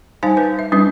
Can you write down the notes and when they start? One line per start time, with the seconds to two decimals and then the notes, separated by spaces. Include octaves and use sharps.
0.23 G3 D#4 C5 F5 G#5 A5
0.37 B4
0.59 E5
0.72 G3 C#4 D4 E4 B4 E5